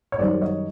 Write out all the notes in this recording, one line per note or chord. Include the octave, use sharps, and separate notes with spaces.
C#5
F#2 D#3 G3 C5 D5
C#5 D#5